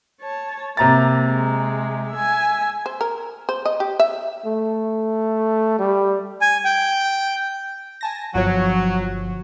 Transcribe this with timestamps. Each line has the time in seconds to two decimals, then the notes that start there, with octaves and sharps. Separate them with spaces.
0.20 C#5 A5
0.77 C3 A#3 A#5 A6
1.28 G#3
2.12 E5 G#5
2.86 C5
3.01 A#4
3.49 C5
3.66 D#5
3.80 G4
3.99 E5
4.46 A3
5.79 G3
6.42 G#5
6.65 G5
8.01 G#5 A5 A#6
8.34 G1 F3 F#3 C#5